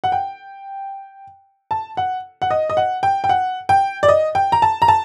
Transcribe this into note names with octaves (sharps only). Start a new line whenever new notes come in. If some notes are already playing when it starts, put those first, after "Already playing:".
F#5
G5
A5
F#5
F#5
D#5
D#5
F#5
G5
G5
F#5
G5
D5
D#5
G5
A#5
A5
A#5
A5